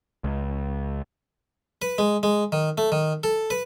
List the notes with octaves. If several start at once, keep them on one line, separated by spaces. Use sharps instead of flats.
C#2
B4
G#3
G#3
D#3
A3
D#3
A4
B4